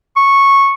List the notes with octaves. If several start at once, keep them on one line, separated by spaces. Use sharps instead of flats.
C#6